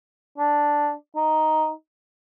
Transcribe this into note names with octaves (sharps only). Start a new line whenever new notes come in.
D4
D#4